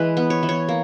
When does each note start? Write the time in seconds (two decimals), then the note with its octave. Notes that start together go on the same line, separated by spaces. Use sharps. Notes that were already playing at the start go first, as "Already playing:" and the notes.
Already playing: E3 G#3 B4
0.17 B3
0.30 C#5
0.43 E3
0.49 C#5
0.69 A#3